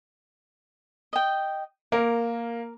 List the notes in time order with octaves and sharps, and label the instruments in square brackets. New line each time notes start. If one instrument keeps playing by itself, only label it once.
[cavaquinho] D#5 G5
[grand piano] A#3 [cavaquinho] A#4